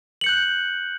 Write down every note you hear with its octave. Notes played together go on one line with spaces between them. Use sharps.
F#6 G6 C#7 F#7